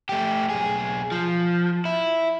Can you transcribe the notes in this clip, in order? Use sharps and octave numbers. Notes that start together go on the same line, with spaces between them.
A3 G4
B1 G#4
F3
E4